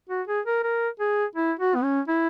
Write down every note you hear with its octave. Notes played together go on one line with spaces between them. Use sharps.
F#4
G#4
A#4
A#4
G#4
E4
F#4
B3
C#4
E4